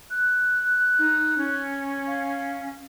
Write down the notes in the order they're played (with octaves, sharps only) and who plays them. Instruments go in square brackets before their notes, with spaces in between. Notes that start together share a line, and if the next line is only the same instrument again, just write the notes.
[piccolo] F#6
[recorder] D#4
C#4
[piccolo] F5